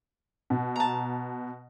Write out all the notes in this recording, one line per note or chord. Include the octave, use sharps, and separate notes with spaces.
B2
A5 A#5